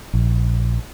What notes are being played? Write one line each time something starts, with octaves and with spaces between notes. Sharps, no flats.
A#1